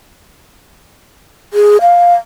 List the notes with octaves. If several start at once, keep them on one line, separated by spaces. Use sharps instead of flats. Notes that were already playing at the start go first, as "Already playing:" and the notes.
G#4
F5